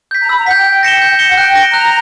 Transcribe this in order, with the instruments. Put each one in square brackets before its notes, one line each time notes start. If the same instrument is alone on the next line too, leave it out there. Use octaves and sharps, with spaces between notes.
[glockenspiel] G6 B6
[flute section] A#5
[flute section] B5 [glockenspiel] E6
[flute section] A#5
[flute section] F#5 [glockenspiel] B6
[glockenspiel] G6
[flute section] G5
[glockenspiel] G6
A#6 C#7 E7 G7
G6
A#6 C#7 E7 G7
[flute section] F#5
[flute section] G5 [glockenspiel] F#6
[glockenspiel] A#6 D7 G7
[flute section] A#5 [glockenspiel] F#6